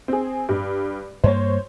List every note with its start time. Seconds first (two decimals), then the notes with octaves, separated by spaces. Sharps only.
0.08 C4 G#4
0.49 G2
1.24 G2 A#3 C5 C#5